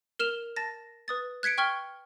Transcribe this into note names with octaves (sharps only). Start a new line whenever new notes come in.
A#4 F6 E7 F7
A5 A6 A#6
B4 D#6 A6
F#6 G#6 B6 C#7 D7
G5 C#6 F6 G#6 G7